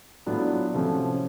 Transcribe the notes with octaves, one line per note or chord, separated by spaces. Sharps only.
A2 F#3 B3 D4 F4
C3 F3 A3 C#4